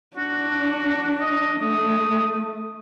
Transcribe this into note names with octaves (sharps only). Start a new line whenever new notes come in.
D4 F#4
D#5
A3 D#6